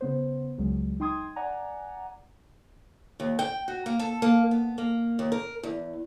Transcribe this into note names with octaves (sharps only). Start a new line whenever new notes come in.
C#3 B3 C5
C#2 F#3 G#3
D#4 G5 C6 D#6 G#6
D5 F#5 G#5 A#5
D#2
G5
F#4
A#3
A4
A#3
B3
A#3
D#2
A#4
E2